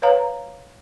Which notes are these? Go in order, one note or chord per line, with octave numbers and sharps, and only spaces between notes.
B4 C#5 F5 A#5